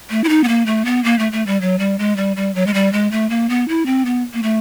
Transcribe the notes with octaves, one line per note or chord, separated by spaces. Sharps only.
A3
E4
D#4
B3
A#3
A3
B3
A#3
A3
A3
G3
F#3
G3
G#3
G3
G3
F#3
G#3
G3
G#3
A3
A#3
B3
E4
C4
B3
A#3
A3